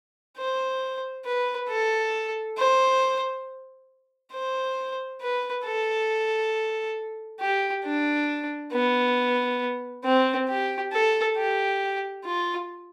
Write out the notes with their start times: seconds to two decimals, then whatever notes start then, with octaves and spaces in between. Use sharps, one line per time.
0.38 C5
1.25 B4
1.69 A4
2.58 C5
4.33 C5
5.21 B4
5.65 A4
7.41 G4
7.85 D4
8.73 B3
10.04 C4
10.49 G4
10.93 A4
11.37 G4
12.25 F4